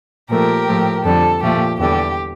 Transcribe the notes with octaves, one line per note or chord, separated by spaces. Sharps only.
A#2 F3 A3 G4 A#4
A2 F3 A3
F2 D3 G3 A4
A#2 F3 A3 G4
E2 D3 G3 G4